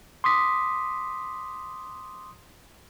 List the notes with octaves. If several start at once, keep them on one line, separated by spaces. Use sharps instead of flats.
C6 D6 D#6 B6